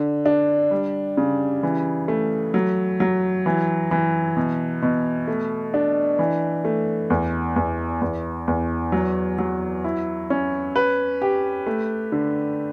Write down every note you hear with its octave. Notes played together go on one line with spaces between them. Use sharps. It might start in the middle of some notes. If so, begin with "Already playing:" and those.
Already playing: D3
D4
G3
C#3
E3
A3
F#3
F#3
E3
E3
B2
B2
A3
D4
E3
A3
E2
E2
E2
E2
F#3
F#3
E4
C#4
B4
G4
A3
D3